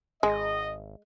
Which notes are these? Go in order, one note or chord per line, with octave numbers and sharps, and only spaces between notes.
G#1 G#3 D#5